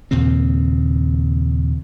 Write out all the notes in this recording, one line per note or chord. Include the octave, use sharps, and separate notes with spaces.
D#2 A#2 C#3 C4